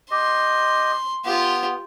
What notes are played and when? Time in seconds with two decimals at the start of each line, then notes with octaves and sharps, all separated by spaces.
0.11 G4 D#5 C6
1.25 B3 F4 G4